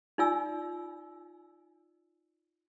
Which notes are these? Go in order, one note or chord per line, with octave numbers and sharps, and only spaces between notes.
D#4 F4 D5 G#5 E6